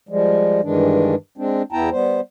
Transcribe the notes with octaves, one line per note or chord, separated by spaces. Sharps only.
F3 G3 G#3
G2 D#3 E3 G#3 D4
G#3 C4 D4
E2 B3 E4 G5 A5 A#5
G3 B3 C5